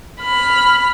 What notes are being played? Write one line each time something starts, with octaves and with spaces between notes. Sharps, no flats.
B5 F6